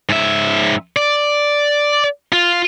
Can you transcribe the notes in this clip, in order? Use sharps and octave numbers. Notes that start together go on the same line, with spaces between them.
G#2 E5
D5
F4